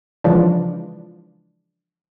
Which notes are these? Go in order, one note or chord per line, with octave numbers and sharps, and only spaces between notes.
C#3 E3 F3 G#3 D4